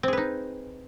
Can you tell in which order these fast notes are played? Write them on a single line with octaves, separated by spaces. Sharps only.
C4 G#4 B4 D#4